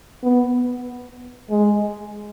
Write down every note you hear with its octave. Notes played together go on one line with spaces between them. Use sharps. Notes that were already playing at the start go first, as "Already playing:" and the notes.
B3
G#3